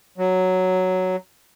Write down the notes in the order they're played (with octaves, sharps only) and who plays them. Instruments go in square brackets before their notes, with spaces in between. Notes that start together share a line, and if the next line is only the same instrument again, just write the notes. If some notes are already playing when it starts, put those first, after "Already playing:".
[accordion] F#3